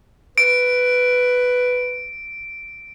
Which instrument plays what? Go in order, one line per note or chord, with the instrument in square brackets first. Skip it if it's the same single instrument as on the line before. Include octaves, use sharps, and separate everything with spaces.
[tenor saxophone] B4 [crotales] D7